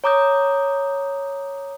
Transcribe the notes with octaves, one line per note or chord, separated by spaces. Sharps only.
C#5 A#5 D6 D#6 G6